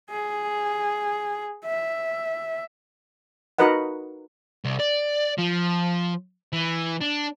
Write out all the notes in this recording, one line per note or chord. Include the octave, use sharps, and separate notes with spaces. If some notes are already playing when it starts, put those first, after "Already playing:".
G#4
E5
D#4 F#4 A#4 B4 D#5 F#5
C2
D5
F3
E3
D4